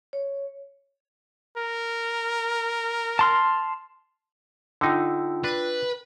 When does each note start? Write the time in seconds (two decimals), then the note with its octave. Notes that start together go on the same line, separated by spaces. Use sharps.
0.13 C#5
1.58 A#4
3.19 A5 C6 F6
4.81 D3 D#4 F4 G5 E6
5.44 D4 B4